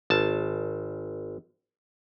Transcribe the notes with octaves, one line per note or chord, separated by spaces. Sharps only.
G#1 A5